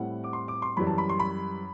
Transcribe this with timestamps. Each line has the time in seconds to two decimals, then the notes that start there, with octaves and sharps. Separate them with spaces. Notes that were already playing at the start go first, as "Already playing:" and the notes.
Already playing: A2 G3 C4 E4 F#5
0.24 D6
0.33 C6
0.48 D6
0.62 C6
0.77 F#2 E3 G3 B5
0.87 A5
0.98 B5
1.09 C6
1.20 B5